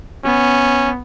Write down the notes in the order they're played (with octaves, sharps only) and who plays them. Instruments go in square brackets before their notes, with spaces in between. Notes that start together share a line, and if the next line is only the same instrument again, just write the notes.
[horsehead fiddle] B3 [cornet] C#4